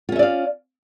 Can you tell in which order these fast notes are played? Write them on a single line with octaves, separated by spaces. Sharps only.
F4 C#4 E5 D5 F5